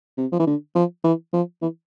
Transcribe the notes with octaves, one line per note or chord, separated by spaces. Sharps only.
C3
F3
E3
D3
F3
E3
F3
E3